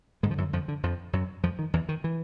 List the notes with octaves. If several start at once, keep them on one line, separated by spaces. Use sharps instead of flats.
F2 G#2 D3 G#3
F3
F#2 F#3
F2 F3
D3
F2 F3
F#2 F#3
F2 F3
D#3
E2 E3
D#3
E3